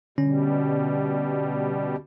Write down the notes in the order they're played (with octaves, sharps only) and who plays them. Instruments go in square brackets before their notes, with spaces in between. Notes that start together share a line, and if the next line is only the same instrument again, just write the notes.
[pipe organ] B2 G3 [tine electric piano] D3 C#4